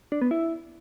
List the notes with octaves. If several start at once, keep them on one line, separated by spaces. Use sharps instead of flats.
D4
B3
E4